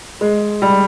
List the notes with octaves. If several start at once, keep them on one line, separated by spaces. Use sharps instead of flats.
G#3
G3